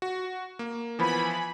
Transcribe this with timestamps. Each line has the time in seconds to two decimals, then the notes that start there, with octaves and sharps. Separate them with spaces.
0.02 F#4
0.59 A#3
0.99 E3 F3 B3 G#5 B5